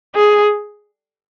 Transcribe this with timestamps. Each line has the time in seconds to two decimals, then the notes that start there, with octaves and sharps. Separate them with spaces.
0.15 G#4